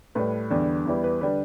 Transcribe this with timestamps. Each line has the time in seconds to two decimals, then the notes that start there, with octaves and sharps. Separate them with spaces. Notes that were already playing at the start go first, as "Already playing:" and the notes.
0.15 A2 G3 B4
0.50 E2 D3 G3
0.85 E2 E3 G3
1.04 B4
1.21 D3 G3 B4